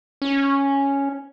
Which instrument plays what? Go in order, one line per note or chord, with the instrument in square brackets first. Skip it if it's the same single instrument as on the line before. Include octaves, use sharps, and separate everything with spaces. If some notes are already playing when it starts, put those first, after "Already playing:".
[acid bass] C#4